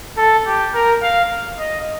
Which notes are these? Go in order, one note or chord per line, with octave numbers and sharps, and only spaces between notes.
A4
G4
A#4
F5
D#5